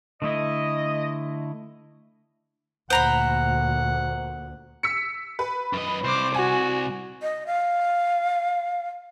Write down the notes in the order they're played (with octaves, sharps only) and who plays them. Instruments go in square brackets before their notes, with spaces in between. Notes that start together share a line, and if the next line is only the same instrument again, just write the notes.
[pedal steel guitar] D3 A3 E4 [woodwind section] D#5
[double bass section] D2 A#2 [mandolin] C5 A#5 B5 [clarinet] F#5
[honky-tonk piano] E6 B6 C#7
B4
[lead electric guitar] F#2 D#5
[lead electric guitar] C2 [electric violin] C5 D6
[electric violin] F#4 [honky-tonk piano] G#5
[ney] D#5
F5